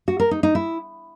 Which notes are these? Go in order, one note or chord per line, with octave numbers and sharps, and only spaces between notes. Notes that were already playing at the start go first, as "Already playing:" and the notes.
F#4
A#4
D#4
D#4
E4